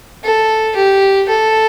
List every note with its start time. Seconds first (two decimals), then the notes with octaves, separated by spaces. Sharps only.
0.24 A4
0.76 G4
1.29 A4